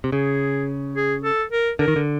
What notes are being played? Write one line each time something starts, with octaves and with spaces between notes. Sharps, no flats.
C3
C#3 G#4
G#4
A4
A#4
D3 A#4
D#3
D3